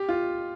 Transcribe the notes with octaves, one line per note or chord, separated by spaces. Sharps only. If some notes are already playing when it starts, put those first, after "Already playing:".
Already playing: G4
F4